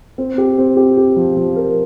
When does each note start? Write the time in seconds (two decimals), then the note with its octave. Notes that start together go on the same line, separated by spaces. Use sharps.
0.18 C4
0.38 G4
0.58 C4
0.77 G4
0.97 G4
1.16 F3
1.37 F3
1.56 A#4